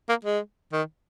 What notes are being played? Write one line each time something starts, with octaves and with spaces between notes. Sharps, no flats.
A#3
G#3
D#3